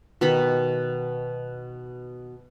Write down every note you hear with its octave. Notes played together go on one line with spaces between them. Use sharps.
B2 D#3 B5